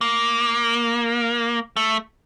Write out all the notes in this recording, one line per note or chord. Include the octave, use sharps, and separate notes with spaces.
A#3
A3